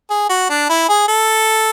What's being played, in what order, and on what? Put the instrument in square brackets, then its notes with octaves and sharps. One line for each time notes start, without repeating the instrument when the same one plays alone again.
[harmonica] G#4
F#4
D4
E4
G#4
A4